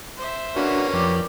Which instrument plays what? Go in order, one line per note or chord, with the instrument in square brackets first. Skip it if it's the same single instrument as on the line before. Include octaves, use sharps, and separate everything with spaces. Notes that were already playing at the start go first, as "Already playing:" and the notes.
[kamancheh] C5 E5
[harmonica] A#3 C#4 B4 [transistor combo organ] D4 F#4
[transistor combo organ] F2 [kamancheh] G4 D5